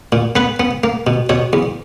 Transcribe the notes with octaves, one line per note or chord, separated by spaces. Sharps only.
A#2
B3 B4
B3
A#3
B2
B2 C#5
E2